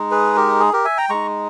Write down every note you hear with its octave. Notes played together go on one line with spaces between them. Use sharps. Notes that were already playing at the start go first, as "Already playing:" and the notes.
Already playing: G#3 D#4
G#4 B4
G4 A#4
G#4
G4 A#4
E5 G#5
G5 A#5
G#3 D#4 A#5 C#6